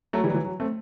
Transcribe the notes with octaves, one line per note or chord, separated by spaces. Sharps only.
F#3 A3
E3 G3
F#3
E3
F#3
A3 C4